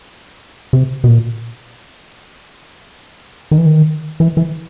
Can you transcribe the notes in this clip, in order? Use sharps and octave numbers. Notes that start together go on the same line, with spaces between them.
C3
B2
A#2
D#3
E3
D#3
E3
E3